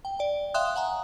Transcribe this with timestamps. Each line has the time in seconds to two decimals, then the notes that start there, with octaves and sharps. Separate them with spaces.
0.05 G5
0.19 D5 G5
0.54 E5 F5 G5 C6 D#6 F#6
0.76 F#5 G#5 A#5